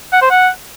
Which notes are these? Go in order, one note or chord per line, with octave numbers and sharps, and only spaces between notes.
F#5
C5
F#5